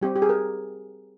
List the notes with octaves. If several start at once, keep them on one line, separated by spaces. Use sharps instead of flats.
G3 C4 G4
G4
G#4
A#4